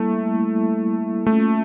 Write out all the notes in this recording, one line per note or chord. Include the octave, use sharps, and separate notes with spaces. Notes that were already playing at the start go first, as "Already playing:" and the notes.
Already playing: G3 A3 A#3 E4
G3 A#3 E4
A3 A#3 C#4 F4